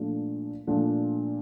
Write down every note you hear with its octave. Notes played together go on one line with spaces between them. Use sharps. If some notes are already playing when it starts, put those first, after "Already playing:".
Already playing: A#2 F3 A3 D4
A#2 F3 A3 D4